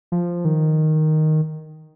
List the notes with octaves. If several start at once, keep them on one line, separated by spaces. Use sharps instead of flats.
F3
D#3